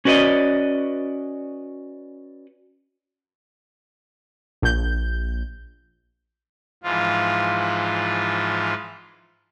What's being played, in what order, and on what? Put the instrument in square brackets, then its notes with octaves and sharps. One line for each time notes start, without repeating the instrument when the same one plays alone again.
[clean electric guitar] C#4 F#4 B4 D5 D#5
[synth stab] A#1 G6
[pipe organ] G#2 E3 F3 F4